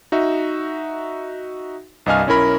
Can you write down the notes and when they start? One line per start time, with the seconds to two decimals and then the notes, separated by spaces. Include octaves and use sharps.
0.12 D#4 F#4 E5
2.06 C2 G2 D#5 F5 G#5 F6
2.27 B1 C#4 E4 A#4 B5